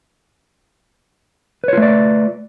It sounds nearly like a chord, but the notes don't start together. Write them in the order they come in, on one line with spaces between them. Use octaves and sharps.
B4 C#5 F4 A3 D5